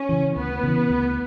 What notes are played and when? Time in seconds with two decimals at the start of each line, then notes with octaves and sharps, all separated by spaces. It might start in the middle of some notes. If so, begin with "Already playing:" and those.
Already playing: C#4
0.09 C#3 E3
0.36 D2 B3
0.63 C#3 E3
0.90 D2